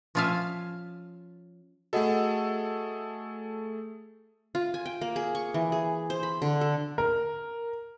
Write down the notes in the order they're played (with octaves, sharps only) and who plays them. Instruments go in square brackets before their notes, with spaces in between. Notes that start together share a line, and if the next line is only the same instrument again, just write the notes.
[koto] F3 C#4 F4 E5 F5 G#5
[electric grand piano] A3 G#4 A4 [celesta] F#4 D#5 F#5
[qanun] F4
G#5
G5
A#3
G#4
C#6
E3
G#4
C5
B5
D3
A4
[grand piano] A#4